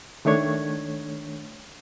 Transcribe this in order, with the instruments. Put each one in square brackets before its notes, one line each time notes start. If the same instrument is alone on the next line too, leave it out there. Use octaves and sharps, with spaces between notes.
[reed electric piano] D#3 A3 D4 C#5 G#6